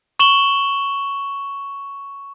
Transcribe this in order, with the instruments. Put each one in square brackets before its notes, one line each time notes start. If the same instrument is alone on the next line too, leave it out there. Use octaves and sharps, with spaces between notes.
[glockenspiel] C#6 E7 F#7 G7